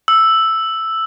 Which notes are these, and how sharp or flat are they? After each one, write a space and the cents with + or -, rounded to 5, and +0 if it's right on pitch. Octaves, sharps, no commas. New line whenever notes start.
E6 +0